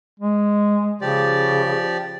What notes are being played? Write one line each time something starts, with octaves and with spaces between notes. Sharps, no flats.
G#3
C#3 F3 G4 D5